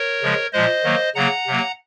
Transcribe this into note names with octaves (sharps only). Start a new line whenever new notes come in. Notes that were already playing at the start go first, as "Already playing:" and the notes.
Already playing: A#4 C#5
C#3 F3 G#3
A#2 F3 G#3 C5 D#5
D#3 F#3 A#3
C#3 F#3 A#3 F#5 A#5
C3 F#3 A#3